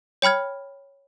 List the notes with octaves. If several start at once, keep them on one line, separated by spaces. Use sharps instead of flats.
C#5 G5 B5 F6 G#6